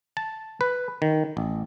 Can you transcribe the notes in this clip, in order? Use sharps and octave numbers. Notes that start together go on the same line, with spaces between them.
A5
B4
D#3
A1